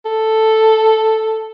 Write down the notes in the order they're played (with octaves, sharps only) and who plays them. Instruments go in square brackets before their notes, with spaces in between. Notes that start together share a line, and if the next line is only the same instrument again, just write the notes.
[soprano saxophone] A4